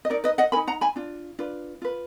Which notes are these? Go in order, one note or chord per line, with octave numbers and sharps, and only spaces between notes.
D#5
D#4 A#4 D5
B4 D#5
D#5 F#5
A#4 G#5 B5
D#4
F#5 A#5
G#5 B5
D4 F4
D4 F4 B4
F4 B4